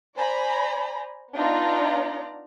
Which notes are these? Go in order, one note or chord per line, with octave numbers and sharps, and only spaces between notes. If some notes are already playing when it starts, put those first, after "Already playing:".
C5 D5 G#5 A#5 B5
B3 D4 D#4 F4 D5 A#5